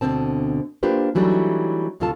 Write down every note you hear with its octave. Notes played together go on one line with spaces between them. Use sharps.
D2 B2 D3 C4 A5
A#3 D4 F4 G4 B4 C5
E3 F#3 G3 A3 D4 D#4
D2 A2 C3 F4 A4 A5